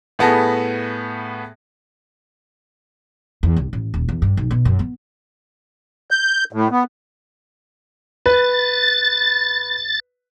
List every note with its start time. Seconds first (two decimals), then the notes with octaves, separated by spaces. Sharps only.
0.19 A2 A3 B3 G#4 A5 A#6
3.43 E2
3.56 C2
3.73 A1
3.94 D#1
4.09 E2
4.22 G2
4.37 B1
4.51 B2
4.65 F#2
4.79 B3
6.11 G6
6.53 A2
6.71 B3
8.26 B4 A6